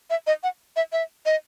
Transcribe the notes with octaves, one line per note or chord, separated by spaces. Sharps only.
E5
D#5
F#5
E5
E5
D#5